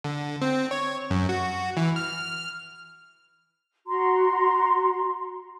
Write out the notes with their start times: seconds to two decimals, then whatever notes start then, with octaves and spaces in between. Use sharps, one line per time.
0.04 D3
0.42 C4
0.71 C#5
1.11 F#2
1.29 F#4
1.77 E3
1.96 F6
3.87 F#4 A#5 C6